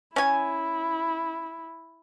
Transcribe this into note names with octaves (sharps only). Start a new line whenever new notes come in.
C#4 E4 G#5